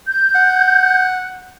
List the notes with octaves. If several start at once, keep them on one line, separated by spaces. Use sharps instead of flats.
G6
F#5